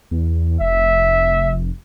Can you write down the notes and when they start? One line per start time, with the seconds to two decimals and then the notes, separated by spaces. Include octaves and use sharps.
0.11 E2
0.61 F1 E5